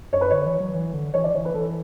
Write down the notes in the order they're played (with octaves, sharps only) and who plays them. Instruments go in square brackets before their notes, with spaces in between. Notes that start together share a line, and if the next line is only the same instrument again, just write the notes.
[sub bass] F#2 [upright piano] C#5
[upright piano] B4
[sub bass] D3 [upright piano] C#5
[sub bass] E3
F#3
E3
D3
[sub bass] E3 [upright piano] C#5
[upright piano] D5
[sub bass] E3 [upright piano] C#5
[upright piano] B4
[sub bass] E3 [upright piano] A4